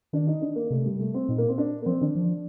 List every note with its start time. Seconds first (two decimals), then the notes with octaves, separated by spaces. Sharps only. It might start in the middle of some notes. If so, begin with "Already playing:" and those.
0.13 D#3 D4
0.27 D#4
0.42 D4
0.56 A#3
0.70 C3 A3
0.85 G3
0.99 A3
1.14 C4
1.28 A#2 D#4
1.38 A#3
1.48 C4
1.58 D4
1.82 A#3
1.86 F3 C4
2.01 D#3 D4
2.15 F3